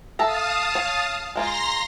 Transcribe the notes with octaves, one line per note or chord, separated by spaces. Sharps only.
A4 E5 F5 A5 A#5 D#6
C#5
G#3 A#3 F4 A#5 C6 A#6